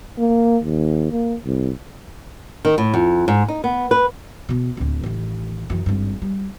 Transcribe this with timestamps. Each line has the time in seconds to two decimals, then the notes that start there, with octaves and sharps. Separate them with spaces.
0.18 A#3
0.63 D#2
1.11 A#3
1.45 C2
2.65 D#3
2.78 A2
2.94 F2
3.28 G#2
3.48 D#4
3.64 B3
3.91 B4
4.49 B2 B3
4.77 D1 D2
5.04 A1 D#3
5.70 F#2 E3
5.86 G#1 G2
6.22 G3